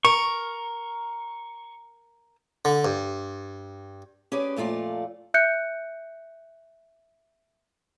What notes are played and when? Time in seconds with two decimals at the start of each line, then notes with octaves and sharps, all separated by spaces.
0.05 A#4 C#6
2.65 D3
2.85 G2
4.32 C#4 G4 G#4 B4 D5
4.56 F2 A#2 A3 F4 D5
5.34 E5 F#6 G6 C#7